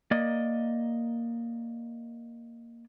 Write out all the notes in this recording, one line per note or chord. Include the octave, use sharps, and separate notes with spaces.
A#3 D5 D#5